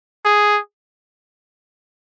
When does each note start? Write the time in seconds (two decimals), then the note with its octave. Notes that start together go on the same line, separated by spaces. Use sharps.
0.25 G#4